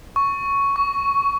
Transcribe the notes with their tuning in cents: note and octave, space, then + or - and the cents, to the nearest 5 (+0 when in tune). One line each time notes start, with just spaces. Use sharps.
C#6 +5
C#6 +20